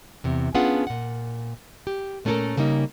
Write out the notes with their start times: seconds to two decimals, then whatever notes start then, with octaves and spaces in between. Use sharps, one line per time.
0.24 E2 C3
0.55 B3 C#4 D4 F4 G#4 F#5
0.87 A#2 F#5
1.87 G4
2.25 A#2 A3 C#4 G4 A4 A#4
2.57 C#3 G3 A#3 D#4